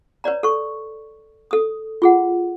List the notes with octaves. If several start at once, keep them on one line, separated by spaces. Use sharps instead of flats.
B4 C#5 D5 A#5
A4 B4 C#6
A4 D#6
F4 G#4 F#5